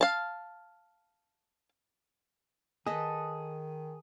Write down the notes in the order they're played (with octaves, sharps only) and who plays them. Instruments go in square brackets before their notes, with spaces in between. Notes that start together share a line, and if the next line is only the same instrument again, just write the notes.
[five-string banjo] F5 A5
[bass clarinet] D#3 [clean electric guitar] G#4 [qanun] A4 B4 D#5